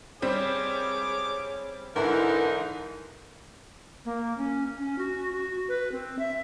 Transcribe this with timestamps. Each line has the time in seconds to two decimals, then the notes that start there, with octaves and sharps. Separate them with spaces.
0.22 G3 C4 G#4 C#5 D6
1.96 G#2 D3 E3 D#4 E4 A#4
4.05 A#3
4.37 C#4
4.78 C#4
4.98 F#4
5.33 F#4
5.69 B4
5.92 C4
6.19 E5